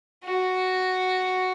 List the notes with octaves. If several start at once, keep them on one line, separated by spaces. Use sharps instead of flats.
F#4